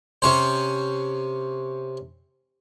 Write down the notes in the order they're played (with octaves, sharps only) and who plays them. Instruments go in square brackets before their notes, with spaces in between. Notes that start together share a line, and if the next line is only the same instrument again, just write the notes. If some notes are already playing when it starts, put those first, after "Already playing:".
[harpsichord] C3 C#4 C5